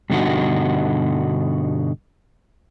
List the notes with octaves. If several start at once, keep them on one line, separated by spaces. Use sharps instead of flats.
G2 B2 D3 D#4 F#4